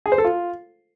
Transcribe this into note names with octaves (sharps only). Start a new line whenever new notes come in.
G#4
C5
A4
F4